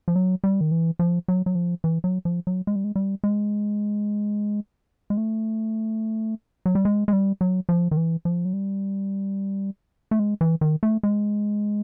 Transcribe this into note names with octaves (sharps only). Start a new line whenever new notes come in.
F3
F#3
G3
D#3
E3
F3
F#3
F#3
F3
E3
F#3
F3
F#3
G#3
G3
G#3
G3
G#3
G#3
A3
F#3
G3
G#3
G#3
G3
F#3
F3
D#3
E3
F3
F#3
G3
A3
G#3
E3
D#3
A3
G#3